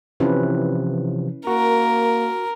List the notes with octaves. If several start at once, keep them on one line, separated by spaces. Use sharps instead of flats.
C3 E3 F3 C#4 E4 B4
A#3 F#4 A#4